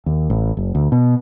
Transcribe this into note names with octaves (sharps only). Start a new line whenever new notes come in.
D#2
A1
F#1
D2
B2